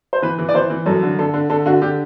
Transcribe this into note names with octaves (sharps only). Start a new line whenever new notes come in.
C5
E3 B4
E3
D5
E3 C5
E3
F#2 A4
D3
D3 A4
D3
D3 A4
D3 F#4
D3 G4